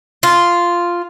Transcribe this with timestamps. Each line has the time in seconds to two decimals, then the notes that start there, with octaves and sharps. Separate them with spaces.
0.23 F4